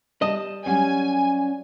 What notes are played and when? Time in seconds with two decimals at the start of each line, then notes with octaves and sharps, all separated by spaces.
0.22 G3 D#5 A5
0.66 F#3 G3 C#4 G#5